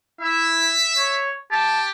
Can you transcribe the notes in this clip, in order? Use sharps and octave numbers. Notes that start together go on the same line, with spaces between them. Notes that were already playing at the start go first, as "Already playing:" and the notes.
E4 E5
C#5
G4 A5